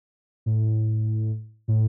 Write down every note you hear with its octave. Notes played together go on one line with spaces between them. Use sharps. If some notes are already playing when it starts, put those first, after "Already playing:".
A2
A2